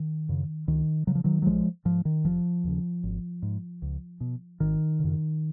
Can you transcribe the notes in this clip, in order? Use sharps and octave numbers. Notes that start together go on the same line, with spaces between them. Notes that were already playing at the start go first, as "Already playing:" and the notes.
Already playing: D#3
F#2 C#3
C#2 D#3
C#3 F#3
F3
D#3 F#3
F#3
A#1 F3 G#3
G#2 F3
D#3
F1 F3
D#2 C#3
G#1
G#2
C#2
B2
G#1 D#3
F#2 C#3